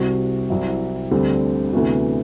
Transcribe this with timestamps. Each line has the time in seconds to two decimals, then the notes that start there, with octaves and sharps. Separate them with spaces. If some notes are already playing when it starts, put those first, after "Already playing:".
Already playing: C2 C3 G3 C4 F#4
0.50 C2 C3 F#3 C4 E4
1.11 D2 D3 G3 C4
1.73 D2 C3 E3 B3 F#4